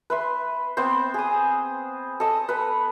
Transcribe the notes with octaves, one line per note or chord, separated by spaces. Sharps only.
B4 E5 C6
B3 C4 C5
G#4 D#6
A4 D#5
B4 B5